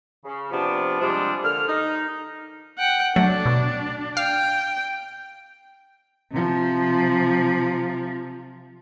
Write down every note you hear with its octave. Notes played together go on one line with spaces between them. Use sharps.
C#3
C3 F3 B3 D4 F4
C3 F3 G3 G#3 D4
D3 A#3 F6
D#4
F#5 G5
F#3 A3 D4
B2
F5 G5
C3 F3